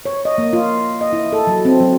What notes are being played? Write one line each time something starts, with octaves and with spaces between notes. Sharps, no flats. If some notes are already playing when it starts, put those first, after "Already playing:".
C#5
D#5
A#3
F4
D#5
E4
A4
F#3
C4
F#3